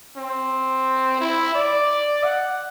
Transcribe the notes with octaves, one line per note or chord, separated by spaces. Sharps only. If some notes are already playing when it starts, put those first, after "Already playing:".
C4
E4
D5
F#5